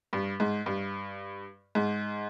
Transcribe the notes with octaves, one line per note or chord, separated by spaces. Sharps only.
G2
G#2
G2
G#2